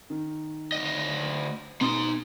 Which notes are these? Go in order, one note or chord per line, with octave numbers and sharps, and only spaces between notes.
D#3
D2 D#5
B2 D#4 C6 D#6